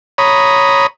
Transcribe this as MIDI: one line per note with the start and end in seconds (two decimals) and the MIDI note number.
0.18 0.87 73
0.18 0.87 82
0.18 0.87 83
0.18 0.87 87